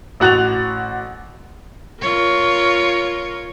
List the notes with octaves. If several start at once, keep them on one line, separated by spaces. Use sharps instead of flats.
A1 F#4 F#6 A6 F7
F4 A#4 C#5